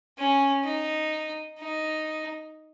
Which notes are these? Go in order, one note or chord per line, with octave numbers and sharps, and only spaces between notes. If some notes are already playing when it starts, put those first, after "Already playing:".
C#4
D#4
D#4